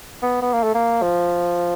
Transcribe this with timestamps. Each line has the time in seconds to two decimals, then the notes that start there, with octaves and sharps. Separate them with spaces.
0.22 B3
0.42 B3
0.53 A#3
0.63 A3
0.75 A#3
1.02 F3